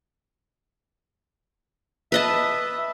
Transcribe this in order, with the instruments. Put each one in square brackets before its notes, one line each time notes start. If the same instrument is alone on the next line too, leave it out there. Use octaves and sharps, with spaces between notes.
[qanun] B4 D#5 A5 [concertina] E5